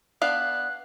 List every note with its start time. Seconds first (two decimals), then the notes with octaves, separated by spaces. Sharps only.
0.22 B3 D4 F5 F#6